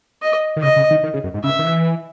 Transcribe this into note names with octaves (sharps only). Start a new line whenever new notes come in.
D#5
D#3
C#3 D#5
C#3
D#3
D#3
C#3
F#2
G#2
C#3 E5
D#3
E3